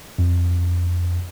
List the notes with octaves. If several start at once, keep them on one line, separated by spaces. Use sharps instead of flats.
F2